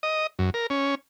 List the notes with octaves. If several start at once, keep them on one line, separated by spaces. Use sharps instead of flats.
D#5
F#2
A#4
C#4